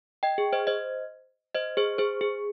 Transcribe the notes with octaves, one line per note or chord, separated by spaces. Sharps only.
D#5 G5
G#4
C5 D#5
C5 D#5
C5 D#5
G#4 C5
G#4 C5
G#4